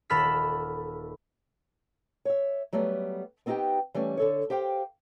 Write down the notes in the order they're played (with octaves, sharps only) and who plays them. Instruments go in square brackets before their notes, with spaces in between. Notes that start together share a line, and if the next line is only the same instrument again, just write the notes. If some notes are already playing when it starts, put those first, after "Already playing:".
[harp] D#1 A4 B5 E6 F6 B6
[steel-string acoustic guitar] C#5 E5
F#3 G3 A3 B3
B3 C4 D#4 F4 G4 G5
E3 G3 A3 C#4
D3 A4 C#5
G4 C5 F5 G5